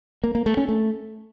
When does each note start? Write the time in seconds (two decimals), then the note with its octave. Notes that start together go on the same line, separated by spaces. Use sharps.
0.24 A#3
0.35 A#3
0.46 A3
0.57 C#4
0.69 A3